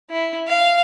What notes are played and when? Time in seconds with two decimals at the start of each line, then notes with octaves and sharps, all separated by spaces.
0.10 E4
0.48 F5